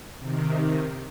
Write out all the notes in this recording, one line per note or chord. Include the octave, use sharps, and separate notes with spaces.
C3 D#3